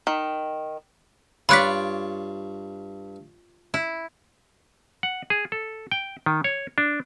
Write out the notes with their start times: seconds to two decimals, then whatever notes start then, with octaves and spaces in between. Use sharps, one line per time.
0.07 D#3
1.49 G2 F4 C#5 D5 B5 C#6 F#6 B6
3.74 E4
5.03 F#5
5.30 G#4
5.52 A4
5.91 G5
6.26 D#3
6.44 C#5
6.78 D4